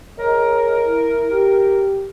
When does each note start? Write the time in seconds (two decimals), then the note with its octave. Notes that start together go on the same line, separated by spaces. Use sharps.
0.18 G#4 A#4 C#5 D#5
0.85 E4
1.30 G4